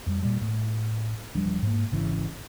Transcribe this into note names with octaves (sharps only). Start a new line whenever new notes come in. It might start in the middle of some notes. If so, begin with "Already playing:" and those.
F2 G3
A#2 G3
A2 A3
D#1 F3 G3 D4
G#2 A#3
G#1 C#3 E3